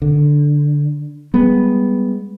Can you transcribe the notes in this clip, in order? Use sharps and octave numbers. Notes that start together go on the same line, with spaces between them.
D3
G3 G#3 B3